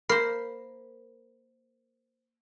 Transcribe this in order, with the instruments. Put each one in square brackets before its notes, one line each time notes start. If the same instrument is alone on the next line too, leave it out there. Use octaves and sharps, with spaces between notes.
[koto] A#3 C5 [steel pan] A#4 B5 [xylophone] F6 A#6 C7